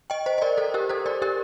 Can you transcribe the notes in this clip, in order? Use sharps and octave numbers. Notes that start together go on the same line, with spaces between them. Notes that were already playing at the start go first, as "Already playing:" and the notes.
D#5 G5
C5 D#5
D#5
A#4 D5
A4 C5
G4 A#4
A4 C5
A#4 D5
G4 A#4